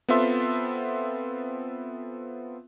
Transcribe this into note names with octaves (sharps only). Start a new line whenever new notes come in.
B3 C4 F4 A4 E5 C6